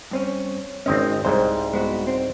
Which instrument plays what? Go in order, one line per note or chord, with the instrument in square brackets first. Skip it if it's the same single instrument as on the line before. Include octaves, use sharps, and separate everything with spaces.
[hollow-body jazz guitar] G2 C4 C#4
[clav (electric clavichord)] G#1 C4 D#5 [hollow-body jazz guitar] D#3 G#3 C#4
[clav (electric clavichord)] C2 G#2 [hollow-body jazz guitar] C5
[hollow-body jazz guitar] G#3 B3 F#4
C4